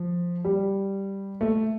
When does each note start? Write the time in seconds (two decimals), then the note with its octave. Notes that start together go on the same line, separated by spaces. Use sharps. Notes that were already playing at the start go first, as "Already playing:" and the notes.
Already playing: F3
0.45 G3
1.41 A3